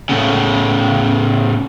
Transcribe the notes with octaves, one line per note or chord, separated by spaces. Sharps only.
A2 C#3